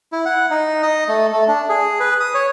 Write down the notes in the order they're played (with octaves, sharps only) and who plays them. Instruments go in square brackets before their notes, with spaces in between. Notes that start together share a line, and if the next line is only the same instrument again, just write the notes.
[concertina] E4
F#5
D#4
D#5
A3
A3
D4
G#4
B4
D#6
C#5